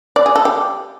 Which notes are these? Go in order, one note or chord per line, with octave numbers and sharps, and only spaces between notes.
D5
G#4
A4
G4